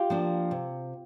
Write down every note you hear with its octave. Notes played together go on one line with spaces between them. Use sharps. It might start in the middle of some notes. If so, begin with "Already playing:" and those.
Already playing: F4 G4
F3 A#3 D4
C3